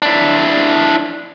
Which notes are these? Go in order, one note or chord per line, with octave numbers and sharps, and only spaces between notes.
D4 E4